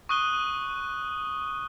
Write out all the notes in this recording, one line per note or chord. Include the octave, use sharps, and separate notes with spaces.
C#6 D#6 F#6 D#7 G7